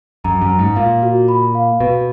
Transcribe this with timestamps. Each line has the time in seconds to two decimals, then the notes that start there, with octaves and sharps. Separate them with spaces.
0.24 F#2 A#5
0.42 F#2
0.50 A#5
0.59 G#2
0.76 A#2 F5
1.03 F#4
1.28 B5
1.55 F5
1.80 B2 B4